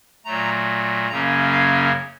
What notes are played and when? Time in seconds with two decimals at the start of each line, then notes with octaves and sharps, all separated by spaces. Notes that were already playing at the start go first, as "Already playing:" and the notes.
0.25 A#2 F#3 A3 A#5
1.09 F#2 C#3 F#3 A#3 C#4 A#5
1.51 F5